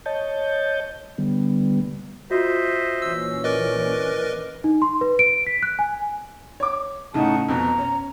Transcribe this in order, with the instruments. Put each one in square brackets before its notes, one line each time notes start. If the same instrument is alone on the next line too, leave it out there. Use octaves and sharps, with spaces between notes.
[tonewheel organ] C#5 D#5 A5 G6
D3 G3 B3
[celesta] F4 F#4 [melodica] C5 D#5 E5
[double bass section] A#2 E3 C#4 [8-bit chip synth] E6
[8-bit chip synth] A#4 B4 D#5 [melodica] D5
[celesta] D#4
C6
B4
D7
B6
F#6
G#5
[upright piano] C#5 D6
[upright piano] A2 C#3 [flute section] D#4 F#5 A5
[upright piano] F2 B2 [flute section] A#5
[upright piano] C#4